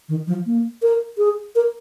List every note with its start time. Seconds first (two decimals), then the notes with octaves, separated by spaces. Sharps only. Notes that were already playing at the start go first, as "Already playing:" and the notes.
0.09 D#3
0.27 F3
0.46 A#3
0.82 A#4
1.18 G#4
1.55 A#4